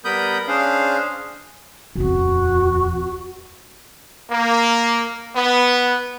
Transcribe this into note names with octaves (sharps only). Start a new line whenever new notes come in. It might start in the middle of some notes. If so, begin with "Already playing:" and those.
G3 B3 A#4 B5 D#6 G6
C#4 D4 G#4 C5 F5
D#1 F2 F#4
A#3
B3